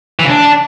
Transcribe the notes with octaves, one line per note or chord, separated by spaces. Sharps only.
E3
C#3
D4